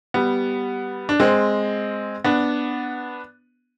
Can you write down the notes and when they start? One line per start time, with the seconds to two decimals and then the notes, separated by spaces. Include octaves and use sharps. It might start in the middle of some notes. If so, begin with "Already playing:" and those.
0.14 G3 B3
1.09 D4
1.20 G#3 C4
2.24 B3 D4